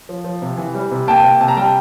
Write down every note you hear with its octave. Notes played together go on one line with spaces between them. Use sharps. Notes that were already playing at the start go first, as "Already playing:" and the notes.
F3
F3
C3
E3
G3
C3
A#3 G5 A5
C3
C3 A5
A#5
G3 G5 A5